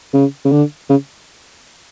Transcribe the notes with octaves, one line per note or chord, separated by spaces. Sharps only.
C#3
C#3
D3
C#3